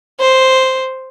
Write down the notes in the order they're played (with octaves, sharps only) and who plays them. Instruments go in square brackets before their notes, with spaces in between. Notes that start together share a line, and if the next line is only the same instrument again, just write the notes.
[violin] C5